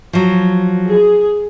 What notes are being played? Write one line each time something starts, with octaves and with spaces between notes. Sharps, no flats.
F3 F#3
G#4